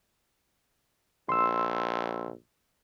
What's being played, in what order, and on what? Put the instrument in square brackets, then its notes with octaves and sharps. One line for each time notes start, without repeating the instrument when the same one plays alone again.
[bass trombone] A#1 [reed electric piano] C6 E6